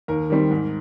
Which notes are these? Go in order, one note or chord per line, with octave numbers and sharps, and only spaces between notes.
D#2 A#4
D#3 G3 C4
G#2